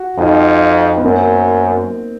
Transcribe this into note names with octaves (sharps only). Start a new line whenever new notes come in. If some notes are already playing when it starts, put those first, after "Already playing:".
Already playing: F#4
F2 D#4 F4
B3
F#2 A#3 C4